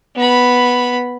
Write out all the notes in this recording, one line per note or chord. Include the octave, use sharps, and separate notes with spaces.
B3 B5